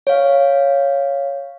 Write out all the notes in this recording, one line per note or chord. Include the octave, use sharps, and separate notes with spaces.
C#5 F5